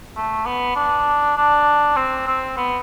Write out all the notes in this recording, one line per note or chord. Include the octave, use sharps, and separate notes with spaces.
A3
B3
D4
D4
C4
C4
B3